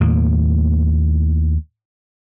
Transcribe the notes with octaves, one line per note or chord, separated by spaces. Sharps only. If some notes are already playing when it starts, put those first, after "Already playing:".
D#2 A2 A#3